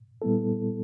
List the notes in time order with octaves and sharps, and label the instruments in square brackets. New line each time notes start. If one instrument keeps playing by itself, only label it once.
[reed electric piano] A#2 G3 B3 E4 A4